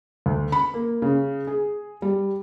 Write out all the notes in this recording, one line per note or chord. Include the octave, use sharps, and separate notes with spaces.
D2
B5
A#3
C#3
G#4
G3